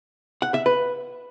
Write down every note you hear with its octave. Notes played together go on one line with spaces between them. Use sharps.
F#5
E5
B4